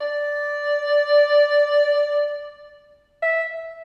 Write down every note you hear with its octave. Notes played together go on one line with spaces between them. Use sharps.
D5
E5